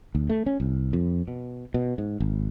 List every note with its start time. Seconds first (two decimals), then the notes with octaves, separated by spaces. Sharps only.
0.15 D2
0.29 A3
0.46 C#4
0.60 C2
0.93 F2
1.28 B2
1.74 B2
1.98 G#2
2.20 G#1